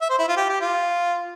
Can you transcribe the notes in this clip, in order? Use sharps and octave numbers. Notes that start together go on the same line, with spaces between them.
E5
C5
E4
F4
G4
G4
F4